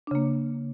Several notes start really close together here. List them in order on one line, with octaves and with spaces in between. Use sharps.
D4 C#3 A#3